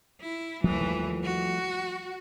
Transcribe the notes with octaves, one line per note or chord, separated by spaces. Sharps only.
E4
D#2 E3 F3 G3 A3
F#4